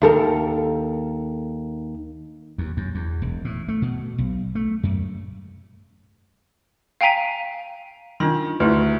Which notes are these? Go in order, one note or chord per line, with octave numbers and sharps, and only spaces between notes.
D#2 A4 A#4
D#2
F#2
E2
E1
A2
A3
B2
B1
A3
F#2
F5 G5 G#5 A#5 B6 D#7
D#3 D4 F4 C6
D2 E4 G4 B4